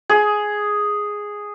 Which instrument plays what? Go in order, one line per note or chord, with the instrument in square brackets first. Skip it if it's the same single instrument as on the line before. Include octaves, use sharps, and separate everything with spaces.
[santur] G#4